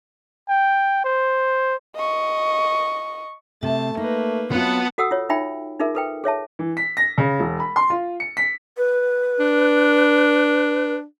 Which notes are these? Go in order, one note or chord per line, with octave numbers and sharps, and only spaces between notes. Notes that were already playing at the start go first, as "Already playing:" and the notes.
G5
C5
D#5 C#6
C3 A3 A5
A#3 D#4 B4
F#3 B3 C4 F4 F#5 A5
F#4 A4 F#5 D#6 E6
F4 C#5
D#4 F4 E5 G5 B5
D#4 F4 G#4 A#4 E5
A4 B4 G5
G#4 C#5 E5 A5
E3
B6
A#6
C#3
E1
B5
C6
F4
C#7
B6
B4
D4